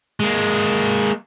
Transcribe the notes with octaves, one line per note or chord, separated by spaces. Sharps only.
G#3 A#3